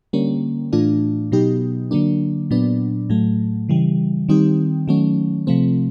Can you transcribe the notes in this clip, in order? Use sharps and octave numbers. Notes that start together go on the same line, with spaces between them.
D3 G3 A#3 C#4
A2 E3 A3 D4 F4
B2 F#3 B3 D#4 G4
D3 F#3 A#3 D4
A#2 F#3 B3 D4
A2 F#3 A3
C#3 E3 G3
D#3 G3 C4 D#4 G4
D#3 F#3 A3 C#4
C3 F3 A3 C4